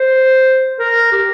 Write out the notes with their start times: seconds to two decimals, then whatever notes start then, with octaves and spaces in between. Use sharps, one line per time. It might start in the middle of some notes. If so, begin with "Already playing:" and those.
Already playing: C5
0.80 A#4
1.12 G4